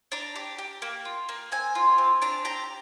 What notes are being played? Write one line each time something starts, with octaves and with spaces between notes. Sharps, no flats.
D4 A#5
G4
G4
A#3
F4
A#3
C4 G#5
F4
C4
D4 A#5
G4 A#5